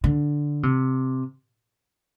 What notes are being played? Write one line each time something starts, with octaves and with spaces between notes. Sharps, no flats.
D3
C3